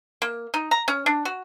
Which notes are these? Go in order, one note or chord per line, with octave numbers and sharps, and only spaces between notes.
A#3
D#4
A#5
C#4
D4
F#4